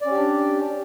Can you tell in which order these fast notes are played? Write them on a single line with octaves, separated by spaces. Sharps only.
D5 C#4 G4 D4